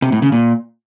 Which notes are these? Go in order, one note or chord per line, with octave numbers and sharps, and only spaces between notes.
C3
A2
C#3
A#2